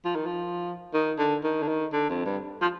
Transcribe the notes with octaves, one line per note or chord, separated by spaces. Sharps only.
F3
D#3
F3
D#3
D3
D#3
D3
D#3
D3
F2
G2
F3